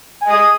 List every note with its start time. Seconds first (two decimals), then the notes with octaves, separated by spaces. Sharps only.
0.22 G#5
0.26 D#5
0.31 D#6